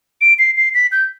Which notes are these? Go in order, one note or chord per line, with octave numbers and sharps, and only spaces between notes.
D7
C7
C7
B6
G6